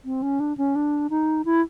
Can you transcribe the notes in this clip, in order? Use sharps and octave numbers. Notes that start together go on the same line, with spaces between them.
C4
C#4
D4
C#4
D4
D#4
E4